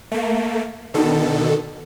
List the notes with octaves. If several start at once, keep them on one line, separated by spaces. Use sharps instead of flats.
A3 A#3
B2 D3 D#3 A4